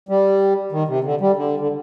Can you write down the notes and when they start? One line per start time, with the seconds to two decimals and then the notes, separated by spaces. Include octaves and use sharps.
0.09 G3
0.72 D#3
0.88 C3
1.04 D3
1.21 G3
1.36 D3
1.60 D3